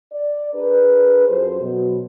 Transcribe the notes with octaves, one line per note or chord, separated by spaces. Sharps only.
D5
D4 G#4 A#4 B4
F#2 F4 A4 C5
B2 F#3